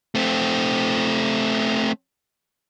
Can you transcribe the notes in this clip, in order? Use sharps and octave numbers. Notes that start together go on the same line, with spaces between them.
A3 C4